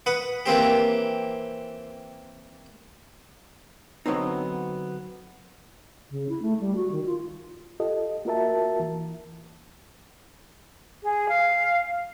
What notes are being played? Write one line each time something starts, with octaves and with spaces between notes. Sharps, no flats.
B4 F#5 D#6
E3 A#3 C4 G4
D3 F#3 B3 C4 D#4
C#3
E4
A3
G3
F#4
D#3
F4
F4 G4 A4 D#5
A#3 F4 F#4 A#4 E5 A5
E3
G#4
F5